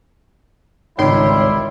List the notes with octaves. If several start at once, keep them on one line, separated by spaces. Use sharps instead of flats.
G#1 C#2 D#3 G3 E4 C#5 C6 D7